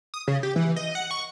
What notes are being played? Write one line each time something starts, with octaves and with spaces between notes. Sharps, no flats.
D#6
C#3
G4
E3
D#5
F#5
C#6